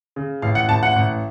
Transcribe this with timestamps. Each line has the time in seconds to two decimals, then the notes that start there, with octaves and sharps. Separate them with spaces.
0.16 C#3
0.42 A1 F5
0.55 F#5
0.68 A1 A5
0.83 F#5
0.96 A1